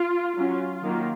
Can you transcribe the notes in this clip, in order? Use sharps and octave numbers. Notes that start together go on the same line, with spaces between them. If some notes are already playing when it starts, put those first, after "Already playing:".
Already playing: F4
F#3 C#4 F4
D#3 F#3 A#3